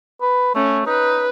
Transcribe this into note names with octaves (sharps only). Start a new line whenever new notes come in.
B4
A3 C#4
D#4 B4